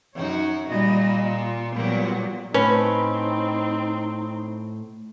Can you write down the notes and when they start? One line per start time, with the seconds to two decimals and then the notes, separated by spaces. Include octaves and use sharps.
0.15 F#2 D#4 F#4 C#5
0.68 A#2 G3 D#5
1.35 F4
1.75 A#2 F#3 G3 B3
2.54 A2 C4 C#4 D#4 B4